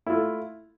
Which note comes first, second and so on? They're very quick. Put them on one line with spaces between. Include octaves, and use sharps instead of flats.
E4 F4 A3